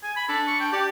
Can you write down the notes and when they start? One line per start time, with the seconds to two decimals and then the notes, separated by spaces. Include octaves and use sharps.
0.03 G#5
0.16 B5
0.29 D4 A4
0.47 C#6
0.60 G5
0.73 G4 D5